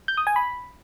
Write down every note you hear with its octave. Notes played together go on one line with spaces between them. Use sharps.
G6
D#6
G#5
B5